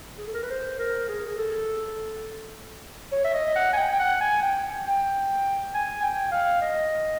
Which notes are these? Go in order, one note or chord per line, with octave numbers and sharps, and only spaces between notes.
G#4
A4
A#4
B4
C5
A#4
G#4
G#4
A4
C#5
E5
D#5
F#5
G#5
G5
G5
F#5
G#5
G5
G5
G#5
G5
F5
D#5